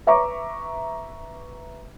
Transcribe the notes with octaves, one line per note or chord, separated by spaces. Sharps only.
B4 E5 A#5 C#6 D6